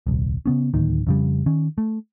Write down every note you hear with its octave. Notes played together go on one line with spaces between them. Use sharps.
D#1 C2
C#3 B3 C#4
D1 D#2 D#3
F2 C#3 G3
D#3 C#4
A3